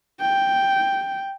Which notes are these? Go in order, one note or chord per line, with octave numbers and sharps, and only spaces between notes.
G5